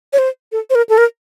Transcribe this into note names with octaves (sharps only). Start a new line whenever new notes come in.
C#5
C5
A4
C5
A#4
A4
A#4